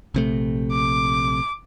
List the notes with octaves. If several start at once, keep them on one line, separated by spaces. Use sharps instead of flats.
A#1 C3 A3
D6